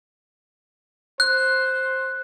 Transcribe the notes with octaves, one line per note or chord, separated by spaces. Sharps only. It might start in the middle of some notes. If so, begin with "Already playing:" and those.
C5 F#6